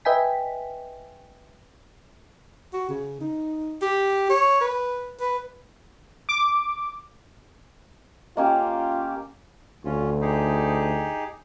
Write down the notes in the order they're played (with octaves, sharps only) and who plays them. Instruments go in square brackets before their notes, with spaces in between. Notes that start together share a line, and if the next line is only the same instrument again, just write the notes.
[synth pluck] B4 D#5 E5 G5 G#5 B6
[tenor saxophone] F#4
C#3
D#4
G4
C#5
B4
B4
[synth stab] D6
[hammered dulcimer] A#3 C#4 G4 [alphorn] F4 [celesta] D#5 G5
[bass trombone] D2 [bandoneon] C#4 F4
[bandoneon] D#4 G4 G#4